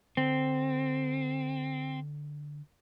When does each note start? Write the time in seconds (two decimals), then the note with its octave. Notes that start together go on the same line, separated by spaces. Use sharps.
0.17 D3 C4